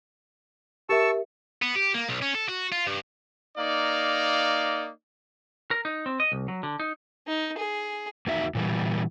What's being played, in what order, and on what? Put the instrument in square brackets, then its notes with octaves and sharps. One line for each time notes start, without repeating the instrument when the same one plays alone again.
[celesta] G4 A#4 E5 [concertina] A5 C#6 E6
[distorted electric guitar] B3
G4
A#3
B1
C#4
A4
F#4
F4
G2
[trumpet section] A#3 D#4 D5 F5
[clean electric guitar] A#4
D#4
C4
D#5
C2
F#3
D3
D#4
[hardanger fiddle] D#4
G#4
[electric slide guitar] E2 A#3 D#4 F#4 E5 A#5
A#2 E3 G3